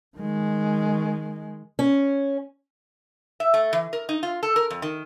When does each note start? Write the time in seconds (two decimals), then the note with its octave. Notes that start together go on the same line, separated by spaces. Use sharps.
0.17 D#3 G#3
1.79 C#4
3.40 E5
3.54 A3
3.73 E3
3.93 A#4
4.09 D#4
4.23 F4
4.43 A4
4.56 A#4
4.70 F2
4.82 D#3